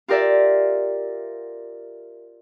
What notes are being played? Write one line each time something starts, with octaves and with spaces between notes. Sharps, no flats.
F4 G4 A#4 D5 E5